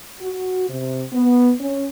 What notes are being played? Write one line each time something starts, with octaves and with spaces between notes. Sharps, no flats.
F#4
C3
B3
C#4